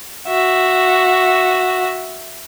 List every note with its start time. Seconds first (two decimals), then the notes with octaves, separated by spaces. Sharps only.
0.27 F#4 E5